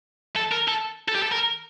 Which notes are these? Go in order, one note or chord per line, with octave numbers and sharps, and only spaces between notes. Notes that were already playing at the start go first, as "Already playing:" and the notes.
A4
A#4
A4
A4
G4
A4
A#4